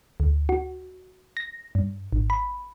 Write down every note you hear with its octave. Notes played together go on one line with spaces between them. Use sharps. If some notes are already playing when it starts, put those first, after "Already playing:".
D2
F#4
A#6
G2
G#1
B5